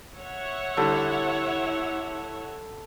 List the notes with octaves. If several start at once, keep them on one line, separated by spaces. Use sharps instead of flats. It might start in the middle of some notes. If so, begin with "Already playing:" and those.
C#5 E5 F#5
D3 G3 E4 A4